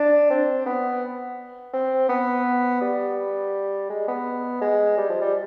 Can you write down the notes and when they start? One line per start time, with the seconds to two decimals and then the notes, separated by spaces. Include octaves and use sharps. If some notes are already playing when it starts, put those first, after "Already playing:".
Already playing: D4
0.30 C4
0.66 B3
1.73 C4
2.09 B3
2.81 G3
3.90 G#3
4.08 B3
4.61 G#3
4.97 G3
5.09 F3
5.22 G3